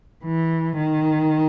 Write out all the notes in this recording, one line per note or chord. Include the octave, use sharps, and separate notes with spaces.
E3
D#3